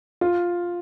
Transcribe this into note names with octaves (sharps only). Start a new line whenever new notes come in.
F4